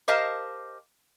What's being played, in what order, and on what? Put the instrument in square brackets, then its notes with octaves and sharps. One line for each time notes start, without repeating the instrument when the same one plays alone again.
[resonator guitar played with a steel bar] G4 A#4 C5 D#5 F5 A5